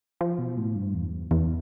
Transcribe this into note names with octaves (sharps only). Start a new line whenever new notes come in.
F3
B2
A2
G2
E2
E2